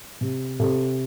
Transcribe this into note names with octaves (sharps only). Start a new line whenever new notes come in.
C3
C3 A4